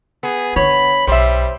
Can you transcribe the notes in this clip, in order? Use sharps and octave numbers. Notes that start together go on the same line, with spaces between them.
B3 G#4
D3 C#5 B5
B1 G3 C5 E5